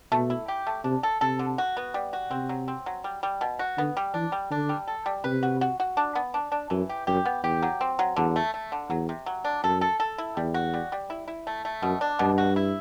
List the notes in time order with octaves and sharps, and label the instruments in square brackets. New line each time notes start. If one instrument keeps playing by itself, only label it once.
[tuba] B2 [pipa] A3
[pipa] E4
G4
A3
[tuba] C3 [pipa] D4
[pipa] A4
[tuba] C3 [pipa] A4
[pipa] D3
F#4
B3
G3
F#4
[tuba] C3 [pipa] C4
[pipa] F#3
C4
F#3
G3
G3
B2
F#4
[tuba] D3 [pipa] B3
[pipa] G3
[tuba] E3 [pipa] D4
[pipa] G3
[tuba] D3 [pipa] D4
[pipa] G3
A4
G3
[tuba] C3 [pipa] B4
[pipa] F#4
F#4
F#4
D4
B3
D4
D4
[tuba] F#2 [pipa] E3
[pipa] G4
[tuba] F#2 [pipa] G4
[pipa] B3
[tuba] E2 [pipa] G4
[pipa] F#3
C4
F#3
[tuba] E2 [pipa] D3
[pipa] A3
A3
D3
[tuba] E2 [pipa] F#3
[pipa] C3
F#3
D4
[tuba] F#2 [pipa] A4
[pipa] A4
A4
E4
[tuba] E2 [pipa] G3
[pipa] F#4
G3
G3
E4
E4
A3
A3
[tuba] F#2 [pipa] B2
[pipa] D4
[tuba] G2 [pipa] B2
[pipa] F#4
E4